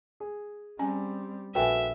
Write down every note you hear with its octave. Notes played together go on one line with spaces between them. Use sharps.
G#4
G3 C4 C#4 G#5
A#1 F#4 A4 B4 E5 G5 G#5